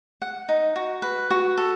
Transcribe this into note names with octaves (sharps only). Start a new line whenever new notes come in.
F#5
D#4
F#4
B4
F#4
A4